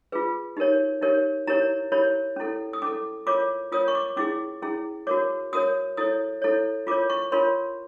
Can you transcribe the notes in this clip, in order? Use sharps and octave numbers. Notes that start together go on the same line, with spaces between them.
F4 G#4 B4
D#4 G4 A#4 C#5
D#4 G4 A#4 C#5
E4 G4 A#4 C#5 A#5
E4 G4 A#4 C#5 B5
C#4 E4 A4
D#6
C#4 E4 A4 D6
F4 A#4 C#5 D6
F4 A#4 C#5 D#6
C#6
D6
C#4 E4 G#4 D6
C#4 E4 G#4
F#4 A#4 C#5 D6
F#4 A#4 C#5 D#6
E4 A4 C#5 D#6
E4 A4 C#5
F4 A#4 C#5 D6
C#6
F4 A#4 C#5 C6